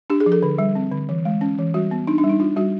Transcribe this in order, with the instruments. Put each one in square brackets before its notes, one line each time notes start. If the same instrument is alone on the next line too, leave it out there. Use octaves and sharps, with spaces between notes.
[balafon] D4 G4
G#4
F3
A4
D3
G3
C4
D3
E3
G#3
C#4
E3
G3 F#4
B3
D4 D#4
D4
G3
D#4
D4 F4
G3 F#4